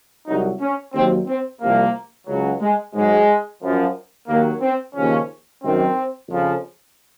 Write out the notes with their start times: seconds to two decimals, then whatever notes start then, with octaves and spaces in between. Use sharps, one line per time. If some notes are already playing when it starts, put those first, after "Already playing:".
0.26 C2 C3 F#3 D#4
0.60 C#4
0.93 D#2 D#3 F#3 C4
1.27 C4
1.60 C2 C3 F3 A#3
2.27 C#2 C#3 F#3
2.61 G#3
2.94 G#2 F#3 G#3
3.62 F#2 F3
4.28 D#2 D#3 F#3 A#3
4.61 C4
4.95 D#2 C#3 F3 C#4
5.62 F#2 D#3 F#3 C4
6.29 F2 C#3 F3